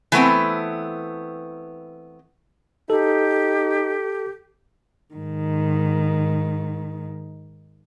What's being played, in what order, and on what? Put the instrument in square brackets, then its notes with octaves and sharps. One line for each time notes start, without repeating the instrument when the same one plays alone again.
[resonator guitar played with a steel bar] E3 A3 B3 C4
[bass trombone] D#4 [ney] G4 [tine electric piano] A4
[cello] G#2 D#3